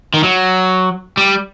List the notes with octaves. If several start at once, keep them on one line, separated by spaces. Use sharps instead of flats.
D#3
F#3
G3